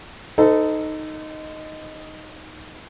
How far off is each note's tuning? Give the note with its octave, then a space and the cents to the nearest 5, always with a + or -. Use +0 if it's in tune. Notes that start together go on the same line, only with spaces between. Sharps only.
D#4 +0 A4 +0 C5 -40